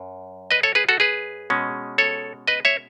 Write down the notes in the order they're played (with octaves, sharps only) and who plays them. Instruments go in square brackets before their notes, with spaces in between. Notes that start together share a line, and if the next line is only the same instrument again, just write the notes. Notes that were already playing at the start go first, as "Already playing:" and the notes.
Already playing: [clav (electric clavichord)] F#2
B4 D#5
A4 C#5
G#4 B4
F#4 A4
G#4 B4
B2 G#3 C#4
A4 C#5
B4 D#5
C#5 E5